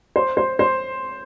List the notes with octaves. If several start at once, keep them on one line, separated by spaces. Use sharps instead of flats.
C5
C5
C5